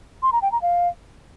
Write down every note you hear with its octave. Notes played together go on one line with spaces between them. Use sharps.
C6
A#5
G5
A#5
F5